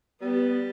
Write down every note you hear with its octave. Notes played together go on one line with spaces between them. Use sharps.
G3 B3